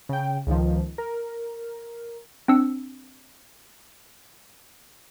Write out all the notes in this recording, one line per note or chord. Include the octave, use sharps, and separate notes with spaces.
C#3 G5
C#2 D#3 F3
A#4
C4 D4 E6 C#7